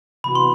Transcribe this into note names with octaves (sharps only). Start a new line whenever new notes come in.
C3 E3 B3 F#4 B5
C6